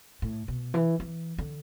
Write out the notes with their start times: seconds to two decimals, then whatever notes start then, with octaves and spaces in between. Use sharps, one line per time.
0.22 A2
0.48 B2
0.74 E3
1.00 E3
1.38 D3